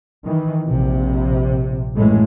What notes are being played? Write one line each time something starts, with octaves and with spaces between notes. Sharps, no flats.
D#3 E3
A#1 C3
F#2 A2 E3 G#3 A3